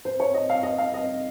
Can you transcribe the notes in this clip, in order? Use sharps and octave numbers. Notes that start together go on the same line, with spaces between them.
C5
C#5
D#5
F5
D#5
F5
D#5